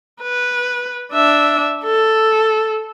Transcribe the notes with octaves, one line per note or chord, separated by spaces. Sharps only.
B4
D4 E5
A4